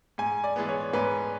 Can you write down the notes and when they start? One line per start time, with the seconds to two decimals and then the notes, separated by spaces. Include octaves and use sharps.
0.18 G#2 G#5
0.44 D5
0.56 E3 G#3 B3
0.68 C#5
0.93 G#2 B4